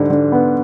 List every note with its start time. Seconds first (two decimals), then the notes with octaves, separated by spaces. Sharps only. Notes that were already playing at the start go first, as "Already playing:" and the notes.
Already playing: G#2 D3 G3
0.10 D3
0.32 B3